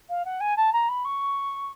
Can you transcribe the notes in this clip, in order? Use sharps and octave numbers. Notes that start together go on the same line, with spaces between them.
F5
F#5
G#5
A5
A#5
B5
C#6